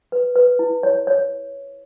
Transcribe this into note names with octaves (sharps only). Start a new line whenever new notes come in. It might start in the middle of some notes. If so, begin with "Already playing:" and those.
B4
B4
E4
C#5
C#5